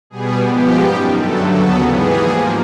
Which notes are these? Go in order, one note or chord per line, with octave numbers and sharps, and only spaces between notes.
B2 G3 B3 G#4
G#2 F3 G#3 B3 G4
F#2 D#3 G3
G2 D3 F#3 A3 A4
D#2 C#3 F#3 B3 A4
G#2 E3 G3 B3 G#4
G#2 F3 A#3